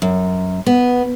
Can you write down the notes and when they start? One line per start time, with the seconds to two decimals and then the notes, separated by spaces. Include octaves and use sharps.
0.02 F#2
0.66 B3